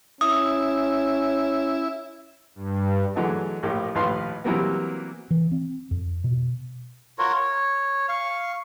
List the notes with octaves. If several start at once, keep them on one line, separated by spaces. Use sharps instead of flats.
C#4 E4 D#6
G2
D3 E3 F#3 G#3 A3
A#1 A2 G4 A#4
A#1 D#2 A2 B4 F5 C6
C3 E3 F#3 G3 A#3 B3
E3
C4
F2
B2
F4 F#4 A#4 C#5
C#5
F5 C#6